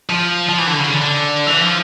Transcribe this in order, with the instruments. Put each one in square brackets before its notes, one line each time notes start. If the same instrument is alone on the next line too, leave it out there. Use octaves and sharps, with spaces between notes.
[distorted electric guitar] F3
F3
E3
D3
C#3
D3
D3
E3
F3